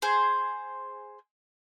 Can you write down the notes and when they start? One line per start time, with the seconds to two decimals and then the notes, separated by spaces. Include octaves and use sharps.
0.02 G#4 C5